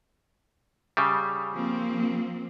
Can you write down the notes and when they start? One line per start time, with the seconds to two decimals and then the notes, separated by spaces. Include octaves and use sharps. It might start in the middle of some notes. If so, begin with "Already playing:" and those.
0.97 C#3 G3
1.54 F3 A#3 C4